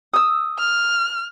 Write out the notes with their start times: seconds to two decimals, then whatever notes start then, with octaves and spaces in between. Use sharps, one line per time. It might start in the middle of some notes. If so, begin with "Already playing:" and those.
0.14 D#6 E6
0.59 F6